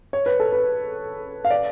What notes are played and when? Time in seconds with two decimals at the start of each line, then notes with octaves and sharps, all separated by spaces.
0.13 C#5
0.26 B4
0.40 A4
0.52 B4
1.45 F5
1.50 D5